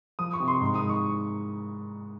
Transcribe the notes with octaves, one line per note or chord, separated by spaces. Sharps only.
F3 D#6
C#6
C3
C6
G#2
D#6
G#2
C#6